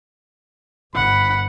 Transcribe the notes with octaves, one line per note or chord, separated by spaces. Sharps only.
G1 F#5 B5